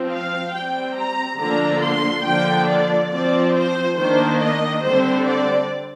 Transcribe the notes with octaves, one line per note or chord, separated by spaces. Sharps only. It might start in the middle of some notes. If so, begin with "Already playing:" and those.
Already playing: F3 C4
F5
G3 C4 G5
A#5
D3 F3 A#3 D4 A#5
C6
D3 F3 A#3 D4 G5
D5
F3 C4 D5
C5
D#3 A#3 D4 C5
D#5
D3 G3 C4 C5
D5